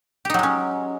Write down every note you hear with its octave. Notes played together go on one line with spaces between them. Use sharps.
F#3 G#3 C#4 D#4 G4